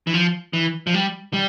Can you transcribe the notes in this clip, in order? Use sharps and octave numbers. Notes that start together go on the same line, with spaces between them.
E3
F3
E3
F3
G3
G3